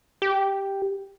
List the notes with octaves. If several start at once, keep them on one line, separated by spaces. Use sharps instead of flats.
G4